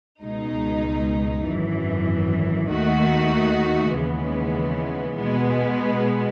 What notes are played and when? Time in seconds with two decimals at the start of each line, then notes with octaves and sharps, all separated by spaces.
0.23 C#2 B2 G#3 D#4
1.47 G#1 F#2 E3
2.71 D#2 D#3 A3 D#4 F#4
3.95 D#2 C#3 E3 G#3 B3
5.19 B2 G#3 B3